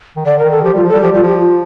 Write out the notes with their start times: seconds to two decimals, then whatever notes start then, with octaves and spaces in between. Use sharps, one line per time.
0.16 D#3
0.26 D3 D5
0.39 A#4
0.44 D#3
0.51 A4
0.63 F3 G4
0.74 G3 F4
0.84 F3
0.89 G3 A4
1.02 F3 G4
1.12 G3 F4
1.23 F3 G4
1.40 F4